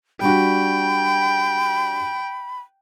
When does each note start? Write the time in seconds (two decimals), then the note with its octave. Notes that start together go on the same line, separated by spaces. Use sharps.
0.21 G3 D4 F#4 G5 B5